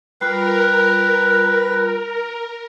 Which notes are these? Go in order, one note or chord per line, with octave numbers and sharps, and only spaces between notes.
G3 F4 A#4 B4